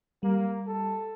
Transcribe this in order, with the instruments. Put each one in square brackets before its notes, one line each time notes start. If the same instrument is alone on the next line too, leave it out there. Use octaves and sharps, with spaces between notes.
[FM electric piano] G3 [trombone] A#3
[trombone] A4